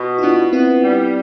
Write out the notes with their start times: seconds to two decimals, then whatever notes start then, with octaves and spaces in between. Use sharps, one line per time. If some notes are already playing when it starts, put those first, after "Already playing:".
Already playing: B2
0.18 E4
0.22 B3 D4 F4
0.52 B3 C4 E4
0.82 G3